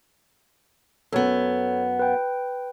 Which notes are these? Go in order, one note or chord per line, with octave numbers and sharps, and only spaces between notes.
F#2 B3 A4 C#5
B4 G5